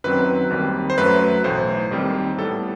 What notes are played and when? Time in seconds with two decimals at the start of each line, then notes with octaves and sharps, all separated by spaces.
0.04 F#2 D#3 F#3 C4 B4
0.50 D#2 D#3 G3 C4
0.90 C5
0.98 F#2 F#3 A3 B4
1.44 B1 A2 E3 C5
1.91 D#2 D#3 G3 C4
2.38 A2 G3 B3 A4